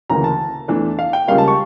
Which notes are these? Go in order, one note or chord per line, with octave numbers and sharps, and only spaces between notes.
D2 C#3 E3 A#3 A#5
A5
E2 E3 A3 D4
F5
G5
C#2 C#3 G3 A#3 F5
A5
C#6